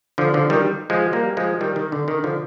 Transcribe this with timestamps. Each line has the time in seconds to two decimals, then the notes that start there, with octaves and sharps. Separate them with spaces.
0.18 D3 F3
0.34 D3 F3
0.50 D#3 G3
0.90 F3 G#3
1.13 G3 A#3
1.37 F3 G#3
1.61 D#3 G3
1.76 D#3
1.92 D3
2.08 D#3
2.24 D3 F3